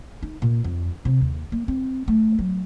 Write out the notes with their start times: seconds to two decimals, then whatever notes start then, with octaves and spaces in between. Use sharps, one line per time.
0.23 D#4
0.42 A#2
0.64 F2
1.05 C3
1.21 D#2
1.52 A#3
1.68 C4
2.08 A3
2.39 F#3